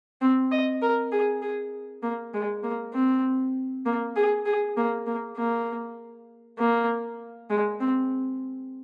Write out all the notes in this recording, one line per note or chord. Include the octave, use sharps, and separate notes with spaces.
C4
D#5
A#4
G#4
G#4
A#3
G#3
A#3
C4
A#3
G#4
G#4
A#3
A#3
A#3
A#3
G#3
C4